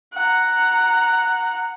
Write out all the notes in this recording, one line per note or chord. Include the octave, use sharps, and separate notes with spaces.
F#5 A#5